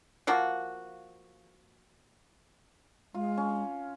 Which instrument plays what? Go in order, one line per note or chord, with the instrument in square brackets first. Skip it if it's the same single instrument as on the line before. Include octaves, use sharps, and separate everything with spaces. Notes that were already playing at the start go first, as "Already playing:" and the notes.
[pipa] F3 A#3 F#4
[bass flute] G#3 [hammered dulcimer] F4
[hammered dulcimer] C#4